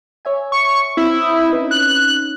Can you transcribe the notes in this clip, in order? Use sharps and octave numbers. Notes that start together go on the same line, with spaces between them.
C#5 E5 G#5
C#6
C4 E4
D#6 G6
C#4 D#4 B4
F#6